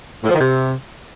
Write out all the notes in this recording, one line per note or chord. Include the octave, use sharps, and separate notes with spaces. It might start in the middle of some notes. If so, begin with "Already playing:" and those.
A2
F3
D#3
C3